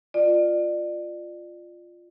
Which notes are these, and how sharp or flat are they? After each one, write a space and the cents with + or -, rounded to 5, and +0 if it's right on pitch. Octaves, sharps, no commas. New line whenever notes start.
F4 +0 D5 +30